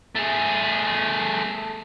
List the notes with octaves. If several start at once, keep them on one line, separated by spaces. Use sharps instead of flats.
A3 G#4